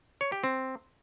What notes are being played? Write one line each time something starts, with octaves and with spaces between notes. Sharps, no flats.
C#5
G4
C4